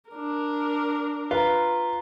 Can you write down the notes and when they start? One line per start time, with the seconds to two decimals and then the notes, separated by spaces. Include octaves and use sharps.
0.10 D4 A#4
1.31 F4 B4 F5 A#5